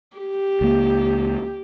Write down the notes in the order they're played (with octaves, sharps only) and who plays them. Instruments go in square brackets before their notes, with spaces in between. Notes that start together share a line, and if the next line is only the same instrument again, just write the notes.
[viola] G4
[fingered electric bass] C#2 A#3